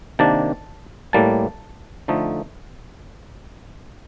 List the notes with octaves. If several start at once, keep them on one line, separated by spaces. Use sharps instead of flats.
C3 D#3 A#3 D4 A5
A2 G3 A#3 A5
D3 F3 A3 D#4